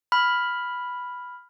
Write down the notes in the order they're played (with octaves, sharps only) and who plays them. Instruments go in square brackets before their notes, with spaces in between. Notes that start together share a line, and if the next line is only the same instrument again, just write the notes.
[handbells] B5 F6